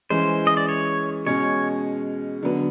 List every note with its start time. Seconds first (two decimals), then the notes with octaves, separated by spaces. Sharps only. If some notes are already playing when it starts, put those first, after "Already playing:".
0.10 E3 G#3 C#4 C5
0.47 D#5
0.57 D5
0.69 C#5
1.26 B2 G#3 C#4 C#5
2.43 D3 F#3 B3